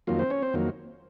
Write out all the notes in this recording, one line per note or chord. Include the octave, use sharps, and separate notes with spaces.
F2 D#3 F#3 A#3 F4
C4 C5
C#4 C#5
C4 C5
F2 D#3 F#3 A#3